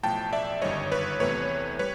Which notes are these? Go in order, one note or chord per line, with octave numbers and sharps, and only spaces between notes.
B1 A2 F3 A3 G5 A5
D5 E5
G1 F#2 D#3 G3 C#5 D#5
B4 C#5
E2 C3 E3 A3 B4 C#5
G3 B4 C#5